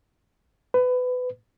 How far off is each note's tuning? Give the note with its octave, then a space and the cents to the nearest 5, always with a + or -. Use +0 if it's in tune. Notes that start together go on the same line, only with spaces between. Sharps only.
B4 +20